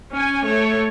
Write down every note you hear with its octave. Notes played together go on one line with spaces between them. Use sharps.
C#4 G#5
A3 C#5